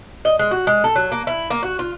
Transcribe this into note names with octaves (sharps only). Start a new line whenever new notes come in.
D#5
G#3
F#4
G#3
A4
F#3
A#3
E4
A#3
F#4
F4